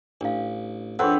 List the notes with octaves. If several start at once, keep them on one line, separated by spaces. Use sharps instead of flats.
A1 D4 F5
F2 C4 D4 G#4 A4 B4 C#5 F#5